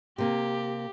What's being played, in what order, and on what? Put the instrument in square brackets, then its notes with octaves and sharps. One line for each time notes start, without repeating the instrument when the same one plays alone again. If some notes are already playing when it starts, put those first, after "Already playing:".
[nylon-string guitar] C3 A#3 [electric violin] G4